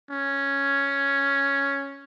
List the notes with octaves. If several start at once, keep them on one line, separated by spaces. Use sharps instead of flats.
C#4